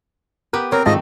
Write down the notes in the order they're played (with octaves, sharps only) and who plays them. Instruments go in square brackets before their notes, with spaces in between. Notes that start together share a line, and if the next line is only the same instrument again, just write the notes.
[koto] B3 G4 B4 [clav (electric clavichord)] A#4
[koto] C4 [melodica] A#4 [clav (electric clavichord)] C#5
[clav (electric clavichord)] G#2 F4 A5 [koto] D#3 A3 [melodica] D#5